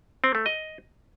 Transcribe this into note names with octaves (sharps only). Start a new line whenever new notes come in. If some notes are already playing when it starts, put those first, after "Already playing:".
C4
A3
D#5